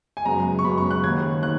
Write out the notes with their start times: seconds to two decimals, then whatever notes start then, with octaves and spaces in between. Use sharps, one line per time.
0.17 G#5
0.25 F#2 C#3 G#3 B3 A#5
0.59 C#6
0.65 F#2 C#3 G#3 B3 B5
0.78 C#6
0.91 F#6
1.03 D#2 D#3 A#3 G#6
1.43 D#3 A#3 F#6